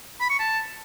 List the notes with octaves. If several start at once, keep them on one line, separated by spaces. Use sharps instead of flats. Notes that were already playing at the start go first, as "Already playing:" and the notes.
B5
C#6
A5